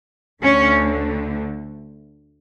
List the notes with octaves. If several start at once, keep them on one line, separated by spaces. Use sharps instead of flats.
D2 D3 A3 C#4